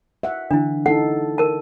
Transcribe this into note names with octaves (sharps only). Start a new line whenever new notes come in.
E5 F#5
D3 E3 D4 E4
D#4 E4 A4 F#5
A#4 A5